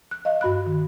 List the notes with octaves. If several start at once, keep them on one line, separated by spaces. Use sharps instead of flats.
F#6
D#5 F5
G2 F#4 B5 F#6
D#3